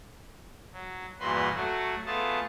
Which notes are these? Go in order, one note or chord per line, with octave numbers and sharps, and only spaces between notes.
F#3
E2 G2 A#2 F#4 B4 C6
F#3 A3 F#4
A3 B3 F4 G#4 A5